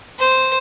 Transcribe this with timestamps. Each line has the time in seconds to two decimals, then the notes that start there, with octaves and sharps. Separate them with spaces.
0.19 C5